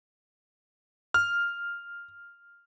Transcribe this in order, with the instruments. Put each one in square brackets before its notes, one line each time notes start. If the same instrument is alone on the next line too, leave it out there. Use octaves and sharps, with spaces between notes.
[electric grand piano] F6